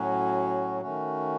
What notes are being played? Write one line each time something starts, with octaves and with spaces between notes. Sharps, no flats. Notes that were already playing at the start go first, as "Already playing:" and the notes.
Already playing: A2 F#3 C#4 F#4
D#3 A3 C#4 F#4